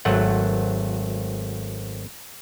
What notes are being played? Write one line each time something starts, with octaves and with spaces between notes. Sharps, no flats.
G#1 F#3 A3 F#5